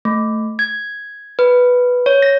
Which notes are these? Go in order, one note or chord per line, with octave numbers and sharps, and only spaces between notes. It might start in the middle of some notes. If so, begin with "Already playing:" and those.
A3
G#6
B4
C#5
A#6